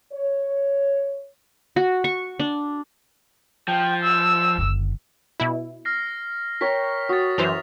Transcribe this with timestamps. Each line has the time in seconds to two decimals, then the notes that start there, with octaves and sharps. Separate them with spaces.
0.13 C#5
1.76 F#4
2.04 C#6
2.39 D4
3.68 F3 G5
4.03 E6
4.58 F#1 D3
5.40 B2 E4
5.85 F6 A#6 C7
6.61 A#4 C#5 G5 B6
7.09 F#4 D#6 A6
7.38 F#2 E3 C5 E5 F7